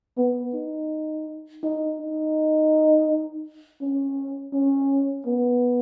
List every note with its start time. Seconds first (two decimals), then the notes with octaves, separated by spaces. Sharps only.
0.18 B3
0.54 D#4
1.63 D#4
1.99 D#4
3.81 C#4
4.53 C#4
5.27 B3